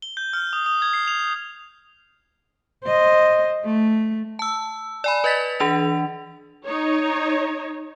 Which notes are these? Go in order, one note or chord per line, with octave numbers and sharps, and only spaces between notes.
G7
G6
F6
D#6
D#6
G#6
C7
F7
F7
C5 D#5
A3
A5 E6
D5 G#5 B5
B4 D#5 A6 B6
E3 D4 F7
D#4 C#5